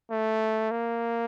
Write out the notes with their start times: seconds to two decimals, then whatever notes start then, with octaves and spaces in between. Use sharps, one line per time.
0.10 A3
0.71 A#3